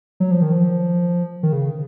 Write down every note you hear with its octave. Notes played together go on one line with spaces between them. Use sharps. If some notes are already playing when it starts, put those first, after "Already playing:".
F#3
F3
D#3
F3
D#3
C#3